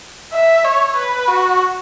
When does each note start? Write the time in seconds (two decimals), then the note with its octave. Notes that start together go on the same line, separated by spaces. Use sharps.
0.32 E5
0.65 C#5
0.97 B4
1.28 F#4